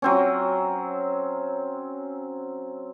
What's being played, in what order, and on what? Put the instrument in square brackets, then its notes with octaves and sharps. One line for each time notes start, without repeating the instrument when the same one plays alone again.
[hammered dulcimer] F#3 C4 C#4